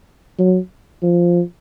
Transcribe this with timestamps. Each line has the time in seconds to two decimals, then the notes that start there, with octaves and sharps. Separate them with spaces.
0.39 F#3
1.03 F3